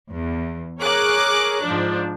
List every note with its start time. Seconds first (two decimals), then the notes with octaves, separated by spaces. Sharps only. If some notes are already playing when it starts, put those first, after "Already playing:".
0.10 E2
0.81 G#4 A#4 C#5 D6 F#6
1.63 G#2 F3 D4